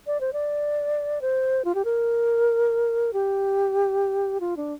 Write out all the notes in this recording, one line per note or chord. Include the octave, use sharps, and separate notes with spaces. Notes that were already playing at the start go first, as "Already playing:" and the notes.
D5
C5
D5
C5
F4
G4
A#4
G4
F4
D4